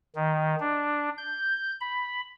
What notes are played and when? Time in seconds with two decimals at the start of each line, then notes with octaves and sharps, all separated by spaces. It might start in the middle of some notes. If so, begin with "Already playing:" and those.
0.16 D#3
0.60 D4
1.18 G6
1.80 B5